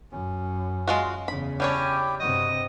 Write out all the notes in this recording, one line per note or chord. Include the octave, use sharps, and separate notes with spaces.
F#2 C#4
G#3 F4 F#4
E2 C#3 B5
G3 C#4 D4 E4 G4 C#5 G5
G2 C3 F#4 D#5 D#6